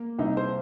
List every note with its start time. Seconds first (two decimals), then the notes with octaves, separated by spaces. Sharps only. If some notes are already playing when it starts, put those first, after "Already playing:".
Already playing: A#3
0.19 C2 D#4
0.37 C5